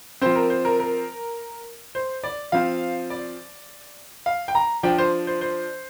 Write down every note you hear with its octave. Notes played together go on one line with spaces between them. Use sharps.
F3 C4 C5
A#4
C5
A#4
A#4
C5
D5
F3 C4 F5
D5
F5
G5
A#5
F3 D4 G5
C5
C5
C5